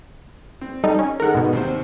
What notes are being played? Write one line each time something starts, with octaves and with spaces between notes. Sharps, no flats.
C4
G3 D#4 A4
C#4
D#3 G#3 A3 A#4 F#5
G#2 B2
D#2 C3 C5